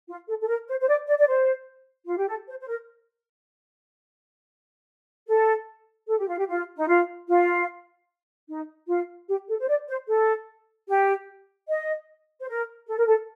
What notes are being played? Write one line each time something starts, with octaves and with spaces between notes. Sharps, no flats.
F4
A4
A4
A#4
C5
C5
D5
D5
D5
C5
F4
G4
A4
C5
C5
A#4
A4
A4
G4
F4
G4
F4
D#4
F4
F4
D#4
F4
G4
A4
C5
D5
C5
A4
G4
D#5
C5
A#4
A4
A#4
A4